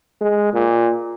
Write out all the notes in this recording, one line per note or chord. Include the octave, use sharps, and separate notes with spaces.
G#3
A#2